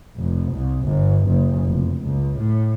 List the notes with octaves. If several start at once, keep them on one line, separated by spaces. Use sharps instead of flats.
F1
C2
G1
F#1
F1
C#2
A2